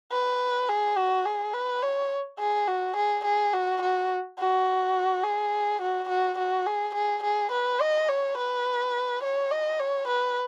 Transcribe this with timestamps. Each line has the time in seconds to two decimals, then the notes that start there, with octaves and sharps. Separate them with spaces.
0.12 B4
0.69 G#4
0.97 F#4
1.26 G#4
1.54 B4
1.82 C#5
2.39 G#4
2.68 F#4
2.96 G#4
3.25 G#4
3.53 F#4
3.82 F#4
4.39 F#4
5.23 G#4
5.81 F#4
6.09 F#4
6.38 F#4
6.66 G#4
6.95 G#4
7.23 G#4
7.52 B4
7.81 D#5
8.09 C#5
8.37 B4
9.23 C#5
9.51 D#5
9.80 C#5
10.07 B4